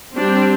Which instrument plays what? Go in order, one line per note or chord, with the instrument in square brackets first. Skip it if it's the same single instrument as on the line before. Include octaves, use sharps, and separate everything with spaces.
[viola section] G3 C4 D4